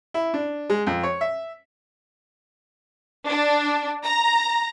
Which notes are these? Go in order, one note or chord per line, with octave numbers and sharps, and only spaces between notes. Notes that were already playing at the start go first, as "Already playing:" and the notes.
E4
D4
G#3
F2
C#5
E5
D4
A#5